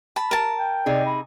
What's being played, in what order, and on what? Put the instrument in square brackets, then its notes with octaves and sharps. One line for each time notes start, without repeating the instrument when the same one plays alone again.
[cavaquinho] A5 B5
A#4 A5
[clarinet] G5
[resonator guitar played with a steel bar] C3 D#4 G#4 [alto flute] D5
[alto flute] B5